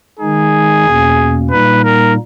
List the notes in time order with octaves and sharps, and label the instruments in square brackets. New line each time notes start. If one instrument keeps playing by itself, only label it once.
[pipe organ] D#3 G#3 D#4 [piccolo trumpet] G#4
[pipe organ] E2 B2 A#3 C#4
[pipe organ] A#2 G3 A#3 D#4 [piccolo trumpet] B4
[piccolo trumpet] A#4